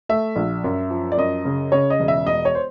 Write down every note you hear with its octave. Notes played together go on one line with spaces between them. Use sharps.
A3 E5
A#1
F#2
F3
D5
F#2 D#5
C#3
C#3 C#5
D#5
E1
E5
E1 D#5
C#5
C5